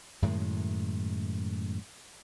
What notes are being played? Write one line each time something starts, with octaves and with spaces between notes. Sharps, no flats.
F#2 A2 D#3 G#3